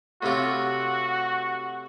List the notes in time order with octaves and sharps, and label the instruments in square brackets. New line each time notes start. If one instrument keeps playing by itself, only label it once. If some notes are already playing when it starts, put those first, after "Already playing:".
[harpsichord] A2 C3 F4 [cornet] F#4